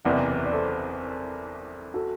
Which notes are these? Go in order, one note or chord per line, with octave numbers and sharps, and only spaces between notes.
F#1 E2 C3 E3 D5 F#5
D5
A4 C5
F#4 A4